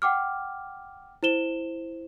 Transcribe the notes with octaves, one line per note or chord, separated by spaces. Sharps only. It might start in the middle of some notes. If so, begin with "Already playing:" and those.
F#5 G5 D6 F6
E4 C5 E7 G7